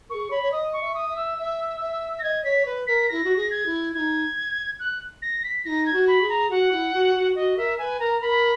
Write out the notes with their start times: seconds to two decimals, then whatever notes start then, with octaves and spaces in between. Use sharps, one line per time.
0.09 G#4 A#4 C#6
0.30 C#5 B5
0.42 C#5
0.52 D#5 D#6
0.73 C#6
0.81 E5
0.95 D#6
1.09 E5
1.17 E6
1.38 E5
1.80 E5
2.19 A#6
2.23 D#5 G#6
2.44 C#5 B6
2.66 B4
2.87 A#4 B6
3.09 E4 A#6
3.24 F#4
3.36 G#4
3.51 G#6
3.66 E4
3.94 D#4 E4 G#6
4.79 F#6
5.22 A#6
5.44 B6
5.65 D#4 E4 A#6
5.86 G#6
5.93 F#4
6.08 B5
6.22 G#4
6.29 A#5
6.50 F#4 F#5
6.72 E4
6.94 F#4
7.15 F#4
7.35 F#4 D#5
7.57 A#4 E5
7.78 B4 G#5
8.00 A#4 A#5
8.21 A#4 B5